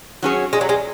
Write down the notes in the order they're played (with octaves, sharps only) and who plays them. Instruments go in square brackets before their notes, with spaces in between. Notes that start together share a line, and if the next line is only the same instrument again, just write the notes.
[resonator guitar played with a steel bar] F#3 C#4 G#4 C#5
[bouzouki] G#3
F#3
G#3